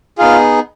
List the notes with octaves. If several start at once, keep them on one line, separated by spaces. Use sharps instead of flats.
B3 D#4 F4 G#4 F5